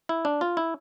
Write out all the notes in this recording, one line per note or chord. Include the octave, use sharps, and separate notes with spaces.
E4
D4
F4
E4